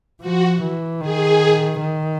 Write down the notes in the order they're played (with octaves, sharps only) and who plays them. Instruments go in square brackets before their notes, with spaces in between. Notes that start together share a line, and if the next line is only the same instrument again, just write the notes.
[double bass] F3 [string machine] F#4
[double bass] E3
[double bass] D#3 [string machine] G#4
[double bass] D#3